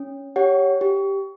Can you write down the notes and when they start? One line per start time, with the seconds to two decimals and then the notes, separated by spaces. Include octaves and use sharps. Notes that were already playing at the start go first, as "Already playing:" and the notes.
Already playing: C#4
0.36 G4 C#5 F#5
0.81 G4